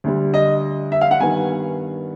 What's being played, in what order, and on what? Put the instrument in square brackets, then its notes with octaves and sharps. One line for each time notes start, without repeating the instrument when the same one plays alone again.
[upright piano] D2 D3 G3
D#5
E5
F5
F#5
G2 D#3 G3 B3 G#5